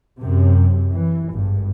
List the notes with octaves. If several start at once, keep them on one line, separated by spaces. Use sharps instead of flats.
F#2 C3
E3
G#1 G2